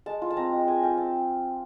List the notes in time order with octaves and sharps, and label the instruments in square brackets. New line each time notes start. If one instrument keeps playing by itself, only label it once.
[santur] G#3 A5
F4
A5
C4 A#5
G#3
G#3 G#5
F4 G5
C4 A5